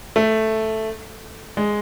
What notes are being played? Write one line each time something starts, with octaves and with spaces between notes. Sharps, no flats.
A3
G#3